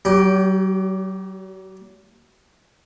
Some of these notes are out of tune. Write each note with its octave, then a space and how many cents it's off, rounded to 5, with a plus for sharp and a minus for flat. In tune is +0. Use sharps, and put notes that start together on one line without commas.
F#3 +40 G4 +0